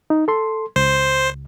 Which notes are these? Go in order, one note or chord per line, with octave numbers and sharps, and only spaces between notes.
D#4
A4 C6
C#2 C5